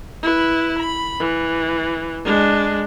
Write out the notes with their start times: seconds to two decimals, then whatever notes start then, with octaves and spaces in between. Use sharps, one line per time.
0.23 E4 B4
0.78 B5
1.19 E3
2.24 G#3 D4